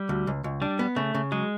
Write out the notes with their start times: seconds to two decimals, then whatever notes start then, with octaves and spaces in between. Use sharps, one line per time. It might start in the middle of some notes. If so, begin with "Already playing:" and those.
Already playing: G3
0.09 D2
0.27 C#2
0.44 C#2
0.62 G3 D4
0.79 B3
0.96 C#3 A3
1.15 C#3
1.32 F#3 G#3